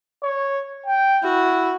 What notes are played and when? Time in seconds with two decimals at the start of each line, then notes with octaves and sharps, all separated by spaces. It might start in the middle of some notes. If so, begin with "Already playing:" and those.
0.23 C#5
0.86 G5
1.24 E4 F#4